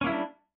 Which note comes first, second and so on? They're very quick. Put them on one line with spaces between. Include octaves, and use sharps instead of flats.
C#4 A#3 E4 G3 D4